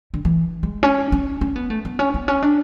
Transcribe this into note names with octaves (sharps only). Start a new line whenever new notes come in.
D3
E3
G#3
C#4
C#4
C#4
B3
A3
B3
C#4
B3
C#4
D4